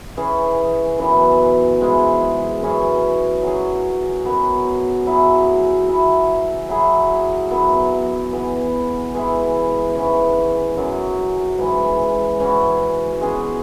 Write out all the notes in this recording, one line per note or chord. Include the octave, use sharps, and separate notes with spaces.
E3 C#4 G#4
F#2 E3 B3
G#2 G#3 E4 G#4
F#2 E3 C#4 G#4
F#3 C#4 G#4
F#2 F#3 B3
F#3 E4 G#4
F#3 E4 G#4
F#3 E4 G#4
F#2 F#3 B3 E4
E3 B3 G#4
E3 G#3 E4 G#4
G#2 E3 C#4
F#2 F#3 C#4
G#2 E3 G#3
E3 C#4 F#4
B2 G#3 C#4 G#4